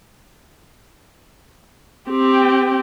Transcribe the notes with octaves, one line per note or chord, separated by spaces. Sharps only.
C4 G4